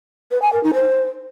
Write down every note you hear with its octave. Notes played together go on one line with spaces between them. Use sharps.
B4
G#5
A#4
D#4
C5